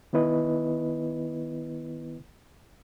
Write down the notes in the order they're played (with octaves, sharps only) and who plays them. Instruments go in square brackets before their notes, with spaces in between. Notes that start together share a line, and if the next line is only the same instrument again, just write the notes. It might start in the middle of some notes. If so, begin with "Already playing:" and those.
[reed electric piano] D#3 B3 E4 B4 D#5